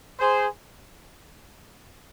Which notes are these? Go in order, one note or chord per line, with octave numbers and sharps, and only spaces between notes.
G#4 C5